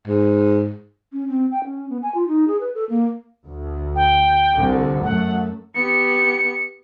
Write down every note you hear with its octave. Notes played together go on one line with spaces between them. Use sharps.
G#2
C#4
C4
G5
C#4
B3
G#5
F4
D#4
G#4
B4
A4
A#3
D2
G5
C2 D3
F#2 A3 F#5
B3 G4 C#7